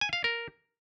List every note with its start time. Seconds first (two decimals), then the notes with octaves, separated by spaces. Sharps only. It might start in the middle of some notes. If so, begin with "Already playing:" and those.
0.01 G#5
0.13 F5
0.24 A#4